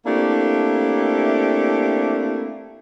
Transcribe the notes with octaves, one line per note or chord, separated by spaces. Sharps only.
A3 A#3 C4 D4 E4 G4